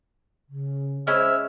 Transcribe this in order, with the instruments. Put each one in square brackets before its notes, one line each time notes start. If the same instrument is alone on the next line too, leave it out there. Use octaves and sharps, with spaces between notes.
[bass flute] C#3
[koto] G#3 C#4 E4 [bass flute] C5 [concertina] E5 F6